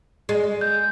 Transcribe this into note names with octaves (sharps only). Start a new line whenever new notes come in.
G#3
G6